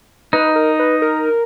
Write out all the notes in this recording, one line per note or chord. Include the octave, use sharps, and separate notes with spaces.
D#4 B4
A#4
B4
A#4